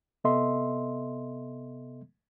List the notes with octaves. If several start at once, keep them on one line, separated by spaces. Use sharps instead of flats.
C3 B3 A4 D#5 E5 C6